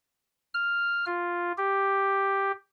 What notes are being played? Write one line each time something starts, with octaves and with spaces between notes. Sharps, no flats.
F6
F4
G4